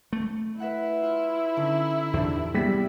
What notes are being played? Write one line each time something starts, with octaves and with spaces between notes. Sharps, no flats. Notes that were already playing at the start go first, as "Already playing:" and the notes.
A3
E4 B4 E5 F#5
F4
D3 C#4 D#4
E2 A2 C3 D4
G3 B3 E6 G#6 B6 E7